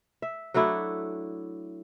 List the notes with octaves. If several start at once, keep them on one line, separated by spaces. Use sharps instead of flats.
E5
F#3 A3 D4 E4